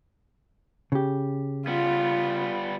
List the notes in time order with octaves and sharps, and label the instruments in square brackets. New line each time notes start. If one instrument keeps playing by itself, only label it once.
[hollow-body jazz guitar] C#3 G4
[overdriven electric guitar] G3 B3 [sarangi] F4